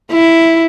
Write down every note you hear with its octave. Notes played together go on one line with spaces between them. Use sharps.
E4